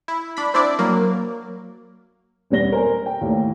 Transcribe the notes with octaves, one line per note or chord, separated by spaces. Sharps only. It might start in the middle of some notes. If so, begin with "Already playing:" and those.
E4
D4 B5
C4 D4 E4 D5
F#3 A#3
E1 G3 B3 C#5 A#6 G7
A4 A#4 C5 G#5
G5
D#2 A2 A#3